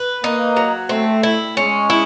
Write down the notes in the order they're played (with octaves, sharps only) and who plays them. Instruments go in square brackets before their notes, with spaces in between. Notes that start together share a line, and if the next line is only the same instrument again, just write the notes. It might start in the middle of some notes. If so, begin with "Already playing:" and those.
Already playing: [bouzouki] B4
[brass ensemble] A#3 [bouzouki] D#4
[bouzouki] F#3
[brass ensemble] A3 [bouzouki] C4
[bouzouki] E4
[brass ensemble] G#3 [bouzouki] C#4
[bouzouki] E4